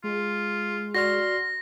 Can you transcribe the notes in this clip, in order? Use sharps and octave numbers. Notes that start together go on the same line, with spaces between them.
G#3 F4
F#4 D5 C6 F6 A#6